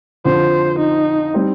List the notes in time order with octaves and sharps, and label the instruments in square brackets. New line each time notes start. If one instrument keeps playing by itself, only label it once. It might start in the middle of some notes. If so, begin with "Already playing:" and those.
[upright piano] F2 D3 F3 [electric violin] C5
[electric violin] D#4
[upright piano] G3 C4 D#4